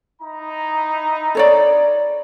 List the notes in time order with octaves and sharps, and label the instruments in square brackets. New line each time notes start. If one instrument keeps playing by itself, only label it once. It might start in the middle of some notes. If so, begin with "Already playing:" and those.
[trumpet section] D#4 E4 A#5
[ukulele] A4 C#5 D5